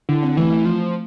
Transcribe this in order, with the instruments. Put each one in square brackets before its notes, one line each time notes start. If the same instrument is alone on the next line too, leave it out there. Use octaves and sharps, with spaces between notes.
[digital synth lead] D3 [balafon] E4
[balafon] C4
[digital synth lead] E3 [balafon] A3
[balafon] A3
[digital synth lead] F3